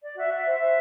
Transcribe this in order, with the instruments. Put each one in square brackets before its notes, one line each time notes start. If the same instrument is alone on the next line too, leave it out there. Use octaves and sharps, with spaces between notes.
[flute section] D5
F#4 E5
F#4
E5
C5
E5
C5